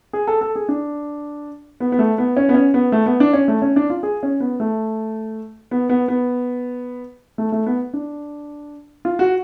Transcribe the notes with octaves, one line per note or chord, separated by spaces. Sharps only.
G#4
A4
A4
G#4
D4
B3
B3
A3
B3
C#4
B3
C#4
B3
A3
B3
D4
C#4
A3
C#4
D4
F4
G#4
C#4
B3
A3
B3
B3
B3
A3
A3
B3
D4
F4
F#4